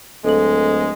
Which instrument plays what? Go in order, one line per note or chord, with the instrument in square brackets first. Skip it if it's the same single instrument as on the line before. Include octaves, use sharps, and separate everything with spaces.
[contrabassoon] D1 [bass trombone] G#3 [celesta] A4 F#7